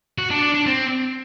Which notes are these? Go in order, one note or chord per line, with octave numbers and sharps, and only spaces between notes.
F#4
D4
D4
D4
C4